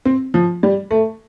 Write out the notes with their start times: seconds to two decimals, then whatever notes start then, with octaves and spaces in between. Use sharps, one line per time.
0.05 C4
0.34 F3
0.63 G3
0.91 A3